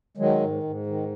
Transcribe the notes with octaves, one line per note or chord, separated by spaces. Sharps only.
D#3 F#3 G#3
G#2
G#2
D#3